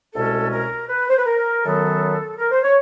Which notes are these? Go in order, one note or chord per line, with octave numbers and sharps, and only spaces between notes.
C2 B2 G#3 C#4 A4
A#4
B4
C5
B4
A#4
F#2 D#3 F#3 B3 A4
A#4
C5
C#5